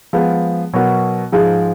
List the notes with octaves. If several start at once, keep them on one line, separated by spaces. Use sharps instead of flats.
F3 G#3 B3
B2 F#3 B3 F#4 A#4
G#2 F3 G#3